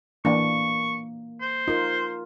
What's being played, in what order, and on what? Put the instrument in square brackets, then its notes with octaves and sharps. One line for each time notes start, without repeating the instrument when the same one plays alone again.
[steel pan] E3 D4 [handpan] A#3 [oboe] C#6
[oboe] C5
[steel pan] D#4 [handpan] F4 A#4